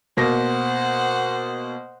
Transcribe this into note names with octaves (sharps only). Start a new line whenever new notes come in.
B2 A#3 C5 F#5 A#6